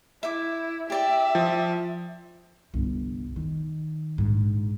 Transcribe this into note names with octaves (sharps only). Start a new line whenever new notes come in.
E4 E5 D6
G4 D5 E5 G5
F3
G1 C2
D#3
A#1 G#2